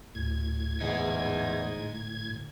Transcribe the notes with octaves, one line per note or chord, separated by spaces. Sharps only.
D2 A2 G#6
E2 D3 G#3 D#4